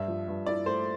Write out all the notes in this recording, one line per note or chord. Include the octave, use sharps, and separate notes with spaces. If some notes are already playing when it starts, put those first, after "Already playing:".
Already playing: G2 E5
F3
G2
E4 D5
A3 C5